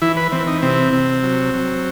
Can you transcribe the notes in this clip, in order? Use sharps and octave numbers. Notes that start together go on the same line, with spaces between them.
E3 E4
B4
E3 C4
D#4
C3 C4
C3
F#3
F#3